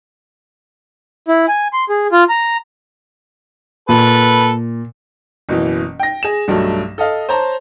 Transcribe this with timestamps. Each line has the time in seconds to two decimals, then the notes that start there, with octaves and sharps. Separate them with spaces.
1.28 E4
1.48 G#5
1.73 C6
1.89 G#4
2.12 F4
2.29 A#5
3.89 A#2 A4 B4
5.49 F#1 B2 E3
5.99 G5 A#6
6.23 G#4 E7
6.48 B1 G2 F#3 A3
6.98 A4 D#5 F5
7.29 C5 C#5 A5 A#5